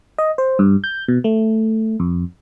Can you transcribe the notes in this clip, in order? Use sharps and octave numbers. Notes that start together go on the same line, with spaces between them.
D#5
C5
G2
G6
B2
A3
F2